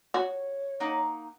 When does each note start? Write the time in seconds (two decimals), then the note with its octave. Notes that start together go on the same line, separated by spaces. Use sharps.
0.14 F#4 C#5
0.80 A#3 D#4 F#5